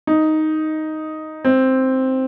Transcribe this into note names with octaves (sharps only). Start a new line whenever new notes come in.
D#4
C4